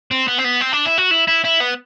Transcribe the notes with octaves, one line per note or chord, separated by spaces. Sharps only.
C4
B3
C4
B3
C4
D4
E4
F#4
E4
E4
E4
B3